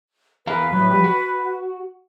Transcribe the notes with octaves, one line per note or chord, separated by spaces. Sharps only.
E2 B4 F5 A#5
A2 F#3
F3 G3
F#4